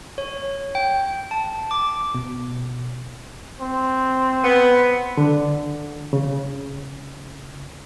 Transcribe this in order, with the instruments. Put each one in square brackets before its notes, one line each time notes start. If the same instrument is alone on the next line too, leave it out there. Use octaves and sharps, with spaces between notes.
[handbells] C#5
G5
A5
D6
[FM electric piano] B2
[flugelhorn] C4
[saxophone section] B3
[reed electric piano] D3
C#3